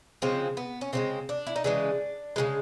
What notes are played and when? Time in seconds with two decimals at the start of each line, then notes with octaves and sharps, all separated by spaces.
0.22 C#3 F3 G#3 C4
0.57 B3
0.81 C#4
0.93 C#3 F3 G#3 C4
1.29 D4
1.47 E4
1.56 D#4
1.64 C#3 E3 G#3 D4
2.36 C#3 E3 G#3